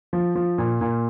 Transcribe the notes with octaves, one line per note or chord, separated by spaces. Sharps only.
F3
F3
A#2
A#2